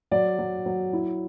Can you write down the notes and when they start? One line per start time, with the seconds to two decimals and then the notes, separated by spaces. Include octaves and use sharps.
0.11 F#3 D5
0.39 F#3
0.66 F#3
0.93 E4